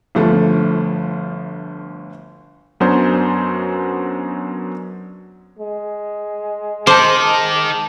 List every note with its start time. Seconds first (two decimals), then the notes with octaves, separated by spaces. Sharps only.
0.15 G1 D2 F3 A3
2.80 F#2 F#3 B3 C#4 D4 C5
5.59 G#3
6.87 D#3 C5 A5 D6